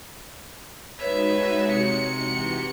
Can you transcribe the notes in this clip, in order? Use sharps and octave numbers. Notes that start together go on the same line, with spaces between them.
G#3 D#4 F#4 B4 C#5 E5
C3 C#7
E3 F#4 G4